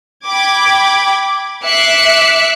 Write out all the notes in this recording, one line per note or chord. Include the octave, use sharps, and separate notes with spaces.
G5 B5 D6 G#6
E5 D6 F#6 C7 C#7